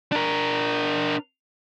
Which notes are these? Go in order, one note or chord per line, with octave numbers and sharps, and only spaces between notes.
D4 A#4